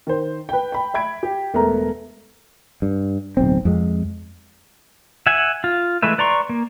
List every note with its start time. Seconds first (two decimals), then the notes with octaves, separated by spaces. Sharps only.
0.07 D#3 C5
0.49 B4 G5
0.72 G5 B5
0.94 E5 B5 G#6 D7
1.23 G4
1.54 E1 A3 B3 A#4 A#5
2.82 G2
3.37 D1 B1 C4
3.65 F2 G#3
5.27 E5 F#5 G#5
5.64 F4
6.03 E3 G#3 A3 B4 E5
6.18 B4 D5 A#5 C6 C#6
6.49 A#3